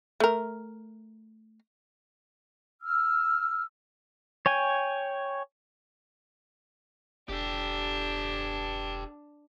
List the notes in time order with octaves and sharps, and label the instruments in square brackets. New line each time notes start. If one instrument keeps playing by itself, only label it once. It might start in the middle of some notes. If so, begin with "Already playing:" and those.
[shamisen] A3 A#4
[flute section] E6 F6
[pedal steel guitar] C#5 G5 G#5
[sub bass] E1 [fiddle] D4 [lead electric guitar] G4 A4